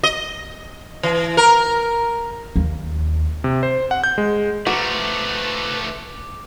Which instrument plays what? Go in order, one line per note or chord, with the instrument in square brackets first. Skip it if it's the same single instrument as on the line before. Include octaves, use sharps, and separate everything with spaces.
[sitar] D#5
E3
A#4
[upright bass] D#2
[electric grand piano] C3
C5
F#5
G6
G#3
[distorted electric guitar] F3 A3 [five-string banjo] F#4 [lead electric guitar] B4 A#5 [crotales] D6